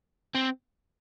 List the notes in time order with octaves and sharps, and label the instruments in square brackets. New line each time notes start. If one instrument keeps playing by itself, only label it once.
[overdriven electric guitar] C4